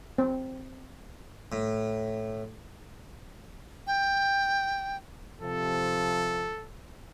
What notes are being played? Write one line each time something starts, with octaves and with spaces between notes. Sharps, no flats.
C4
A2
G5
C3 F3 A4